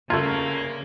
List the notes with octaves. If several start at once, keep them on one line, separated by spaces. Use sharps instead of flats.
D2 C#3 A3 A#3 F4 G#6